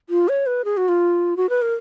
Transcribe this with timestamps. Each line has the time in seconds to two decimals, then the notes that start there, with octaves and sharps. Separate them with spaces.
0.10 F4
0.28 C#5
0.46 B4
0.65 G#4
0.77 F#4
0.88 F4
1.37 F#4
1.49 B4
1.62 A#4